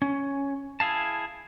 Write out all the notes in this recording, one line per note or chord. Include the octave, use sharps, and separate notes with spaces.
C#4
E4 G#4 F5 A5